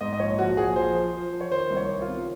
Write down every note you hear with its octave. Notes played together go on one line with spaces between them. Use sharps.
G#2 D#5
D#5
A#1 C#5
A#1 F#4
A#1 G#4
F3 C5
F3
F3
F3
C#5
D#3 C5
C2
C#5
D#3
F4
C3